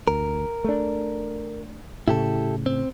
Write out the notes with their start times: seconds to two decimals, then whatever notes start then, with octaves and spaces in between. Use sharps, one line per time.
0.08 D2 A#4
0.64 A3 D4
2.08 A2 C#3 E4 G4 A4
2.66 C4